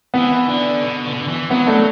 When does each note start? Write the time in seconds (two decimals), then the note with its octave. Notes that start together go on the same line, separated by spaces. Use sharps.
0.14 E3 B3
0.48 D3
0.82 B2
1.05 D3
1.13 B2
1.20 D3
1.28 E3
1.51 F#3 B3
1.67 A3 D4